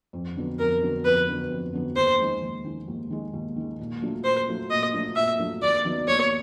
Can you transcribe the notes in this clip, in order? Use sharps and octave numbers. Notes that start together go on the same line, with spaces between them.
F2
D3 F#3 B3
F2 A#4
D3 F#3 B3
F2 B4
D3 F#3 B3
F2
D3 F#3 B3
D#2 C5
D#3 G#3
D#2
D#3 G#3
D#2
D#3 G#3
D#2
D#3 G#3
A#2
F#3 A3 D4 F4
A#2 C5
F#3 A3 D4 F4
A#2 D#5
F#3 A3 D4 F4
A#2 E5
F#3 A3 D4 F4
D#2 D5
D#3 F#3 B3
D#2 C#5